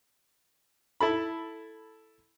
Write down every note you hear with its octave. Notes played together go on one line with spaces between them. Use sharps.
E4 A4 B5